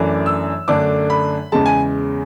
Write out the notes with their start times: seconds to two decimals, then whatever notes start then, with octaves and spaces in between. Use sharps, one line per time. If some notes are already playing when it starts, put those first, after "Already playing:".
Already playing: F#2 E3 A3 D4 D6
0.26 E6
0.68 F#2 D3 A3 D4 D6
1.10 B5
1.52 E2 C#3 G#3 A5
1.66 G#5